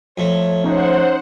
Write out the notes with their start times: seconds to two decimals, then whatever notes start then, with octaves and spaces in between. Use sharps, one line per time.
0.18 F2 A3 C#5
0.64 C#4 D#4 C5 F#5